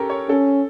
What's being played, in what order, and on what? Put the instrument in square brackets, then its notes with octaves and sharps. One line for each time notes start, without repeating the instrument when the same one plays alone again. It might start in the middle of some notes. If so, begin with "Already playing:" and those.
Already playing: [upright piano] C#4 G4 A4 A#4
C#5
[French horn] C#4 [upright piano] A4